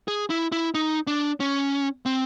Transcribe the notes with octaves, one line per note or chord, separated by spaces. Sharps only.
G#4
E4
E4
D#4
D4
C#4
C4